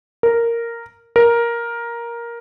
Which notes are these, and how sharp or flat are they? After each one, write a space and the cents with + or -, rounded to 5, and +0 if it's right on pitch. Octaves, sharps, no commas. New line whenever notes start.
A#4 -5
A#4 +10